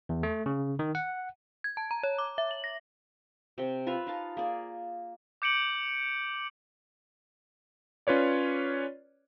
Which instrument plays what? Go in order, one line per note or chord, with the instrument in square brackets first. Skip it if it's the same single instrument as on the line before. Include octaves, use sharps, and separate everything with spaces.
[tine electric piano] E2
A3
C#3
D#3
F#5
[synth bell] G#6
A5
A#5
C#5
D6
E5
F#7
A#6
[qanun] C3 G5
F4 B4 E5 F5
D#4 F5 A5
A#3 G#4 D5
[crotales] D6 G6 C#7 D7 F#7
[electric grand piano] C#4 F4 B4 C#5 D5